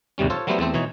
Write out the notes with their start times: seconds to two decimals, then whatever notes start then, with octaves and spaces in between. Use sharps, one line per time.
0.18 D#2 G#2 C3 G3 C#4
0.30 F4 A4 C5 C#5
0.47 F#3 G3 A3 B3 E4 C5
0.59 E2 A3 C4 C5
0.74 B2 E3 D#4 C#5